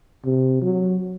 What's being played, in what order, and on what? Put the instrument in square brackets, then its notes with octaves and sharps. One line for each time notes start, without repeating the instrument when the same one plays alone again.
[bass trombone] C3
F#3